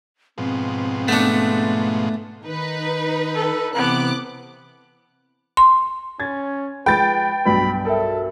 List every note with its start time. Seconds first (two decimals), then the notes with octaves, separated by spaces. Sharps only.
0.38 G#2 B2 F3 C4
1.08 A3 B3 D4
2.44 D#3 D#4 B4
3.35 A4
3.75 C3 E3 B3 C4 D6 F#6
5.57 C6
6.20 C#4 G#6 A6
6.86 F3 G#3 B4 G5 B5 G6 A6
7.45 B1 G2 B2 B4 B5
7.85 A4 A#4 E5